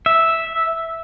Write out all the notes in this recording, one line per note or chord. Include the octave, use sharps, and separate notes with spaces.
E5